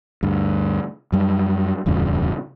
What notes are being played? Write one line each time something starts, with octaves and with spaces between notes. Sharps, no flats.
D2 G2
F#2 G3
D1 E2 G2 C#3